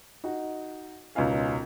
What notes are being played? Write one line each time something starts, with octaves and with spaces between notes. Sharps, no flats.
D#4 F#4
E1 C#2 C#4 D#4 F5 G#5